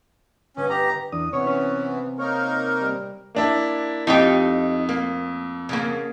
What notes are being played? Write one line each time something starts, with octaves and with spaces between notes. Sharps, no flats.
G1 C#4 D#5
G4 A#5
E2 D4 D#6
C3 E3 B3 C#5
C#4
A#3 D#4 A#4 C#5
G3
A#3 D4 E4
F2 D#4 F4 G4
A#3
C#3 A#3